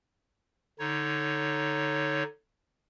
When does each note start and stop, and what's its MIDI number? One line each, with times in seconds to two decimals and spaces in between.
0.79 2.24 50
0.79 2.24 63
0.79 2.24 73